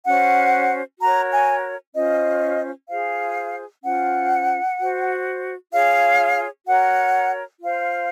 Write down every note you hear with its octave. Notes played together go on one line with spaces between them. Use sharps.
C#4 F#4 C5 F#5
F#4 A#4 C#5 A#5
G#5
C#4 F4 C5 D#5
F4 G#4 C5 F5
C#4 F4 C5 F#5
F#4 C5
F4 G#4 C#5 F5
F#4 A#4 C#5 F#5
F4 C5 F5